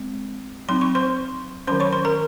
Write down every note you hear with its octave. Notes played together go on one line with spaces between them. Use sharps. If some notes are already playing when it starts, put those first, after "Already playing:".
Already playing: G#3 C4
F#3 C4 D#4 C6
C#6
C5 C6
D#3 F#3 C#4 C5 C6
C#5 C#6
C5 C6
A#4 A#5